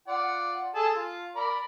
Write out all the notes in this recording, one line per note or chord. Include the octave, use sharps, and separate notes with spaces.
F4 D5 F#5
G#4 A4 A5
F4
A#4 D5 B5